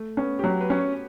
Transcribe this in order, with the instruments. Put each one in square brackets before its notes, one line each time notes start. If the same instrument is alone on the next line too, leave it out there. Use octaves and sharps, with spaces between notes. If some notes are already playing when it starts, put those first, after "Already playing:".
Already playing: [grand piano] A3
[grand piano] B3 [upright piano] C#4
[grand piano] G4
[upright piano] F#3 [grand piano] F#4
[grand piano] B4
[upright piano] C#4
[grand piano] C#5